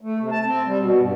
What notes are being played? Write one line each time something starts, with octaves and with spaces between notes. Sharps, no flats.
A3
C3
A5
C4
G3
B2
G2